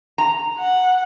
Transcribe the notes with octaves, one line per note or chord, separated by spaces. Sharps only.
A#5
F#5